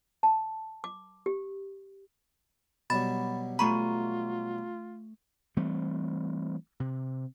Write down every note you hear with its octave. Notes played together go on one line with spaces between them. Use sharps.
A5
D6
G4
B2 F#3 G3 B5 A6
A3 F4 G#5 A#5 B5 C#6
E3 G3 A3 C4
C3